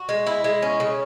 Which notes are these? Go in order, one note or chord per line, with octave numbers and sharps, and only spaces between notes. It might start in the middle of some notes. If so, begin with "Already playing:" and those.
Already playing: F#4
G#3
E4
G#3
C#4
C#3